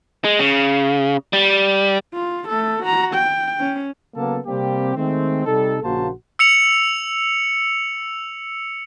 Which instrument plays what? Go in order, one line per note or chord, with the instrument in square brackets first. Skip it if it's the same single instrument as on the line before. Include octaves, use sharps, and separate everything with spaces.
[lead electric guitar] G#3
C#3
G3
[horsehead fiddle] F4
A3 A4
F#4 A#5
G5
C#4
[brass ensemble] C#3 F#3 A#3 B3 A4 A5
C3 G3 A#3 C4 G4
D#3 G#3 A3 C4
C3 G3 D#4 A4
A#1 C#3 A#3 F#4 C5 A5
[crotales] E6 C#7 F7